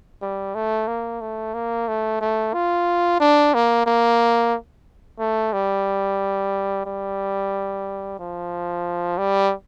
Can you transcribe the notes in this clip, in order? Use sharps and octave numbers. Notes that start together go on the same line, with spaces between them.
G3
A3
A#3
A3
A#3
A3
A3
F4
D4
A#3
A#3
A3
G3
G3
F3
G3